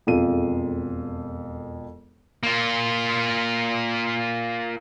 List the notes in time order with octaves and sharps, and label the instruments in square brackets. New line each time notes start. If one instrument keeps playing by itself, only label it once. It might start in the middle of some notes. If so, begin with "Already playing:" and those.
[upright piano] E1 F2 F4 A4 D#7
[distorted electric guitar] A#3 F4